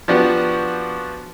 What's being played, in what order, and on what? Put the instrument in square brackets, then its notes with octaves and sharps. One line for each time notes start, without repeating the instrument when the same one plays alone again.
[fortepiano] F3 B3 D4 F#4 G4